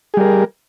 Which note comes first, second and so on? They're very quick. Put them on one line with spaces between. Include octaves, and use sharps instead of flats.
G#4 G3 A#4